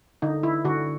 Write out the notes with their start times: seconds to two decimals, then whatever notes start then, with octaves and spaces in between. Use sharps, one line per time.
0.22 D3 D#4
0.43 E4
0.65 D3 F#4